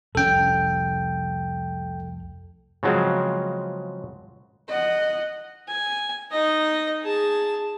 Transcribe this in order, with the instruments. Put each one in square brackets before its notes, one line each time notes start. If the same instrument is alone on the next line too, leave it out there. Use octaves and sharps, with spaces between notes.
[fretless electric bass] F1 C2 C#4 [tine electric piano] A4 G5
[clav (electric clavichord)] C#3 F3 F#3 G#3 C4
[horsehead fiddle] D#5 F#5
[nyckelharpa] G#5
D#4 D#5
G#4 A5